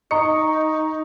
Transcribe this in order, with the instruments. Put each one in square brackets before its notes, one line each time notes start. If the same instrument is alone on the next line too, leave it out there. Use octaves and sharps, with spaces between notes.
[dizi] D#4 [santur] D#5 [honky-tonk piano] A#5 C#7 [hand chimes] C#6